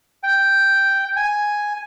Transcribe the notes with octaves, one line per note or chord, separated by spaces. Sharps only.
G5
G#5